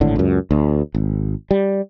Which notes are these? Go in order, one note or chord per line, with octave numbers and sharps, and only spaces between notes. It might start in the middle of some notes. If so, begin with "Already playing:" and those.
G#1 A2 D3
C#2 F#2
D2
G#1
G3